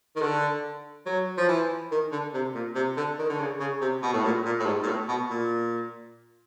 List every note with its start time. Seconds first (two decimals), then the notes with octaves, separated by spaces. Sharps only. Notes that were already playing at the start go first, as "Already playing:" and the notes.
0.16 D#3
0.21 D3
1.06 F#3
1.38 F3
1.49 E3
1.92 D#3
2.12 D3
2.34 C3
2.55 A#2
2.75 C3
2.97 D3
3.19 D#3
3.29 D3
3.39 C#3
3.60 C#3
3.81 C3
4.03 B2
4.13 A2
4.24 A#2
4.45 A#2
4.60 A2
4.66 G#2
4.83 A#2
4.88 A2
5.08 B2
5.30 A#2